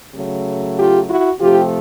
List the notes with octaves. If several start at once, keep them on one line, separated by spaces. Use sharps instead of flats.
C#3 F#3 A3
F4 G4
E4 F#4
C3 F3 A3 F4 G4